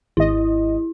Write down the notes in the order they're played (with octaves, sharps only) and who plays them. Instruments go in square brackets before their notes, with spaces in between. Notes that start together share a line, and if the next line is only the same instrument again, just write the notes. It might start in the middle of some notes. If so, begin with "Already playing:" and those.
[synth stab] G#1 D#5 [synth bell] E4